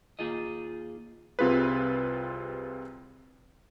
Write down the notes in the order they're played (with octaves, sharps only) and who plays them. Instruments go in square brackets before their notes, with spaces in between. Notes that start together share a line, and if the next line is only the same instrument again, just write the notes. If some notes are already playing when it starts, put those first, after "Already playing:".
[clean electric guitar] D#2 A#3 D#4 F4 G#4 D#5
[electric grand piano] C2 C3 C4 F4 G#4 B4